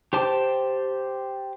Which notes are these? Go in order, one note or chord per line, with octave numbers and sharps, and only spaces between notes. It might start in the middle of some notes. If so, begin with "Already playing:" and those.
G4 C5 A5 D6